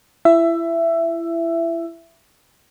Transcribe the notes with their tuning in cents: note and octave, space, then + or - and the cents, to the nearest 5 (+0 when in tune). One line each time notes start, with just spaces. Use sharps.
E4 +25 E5 +15